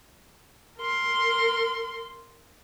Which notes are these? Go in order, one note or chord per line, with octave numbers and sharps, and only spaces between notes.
A#4 C6